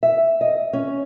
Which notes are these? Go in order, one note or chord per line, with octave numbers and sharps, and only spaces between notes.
E5
D#5
C#4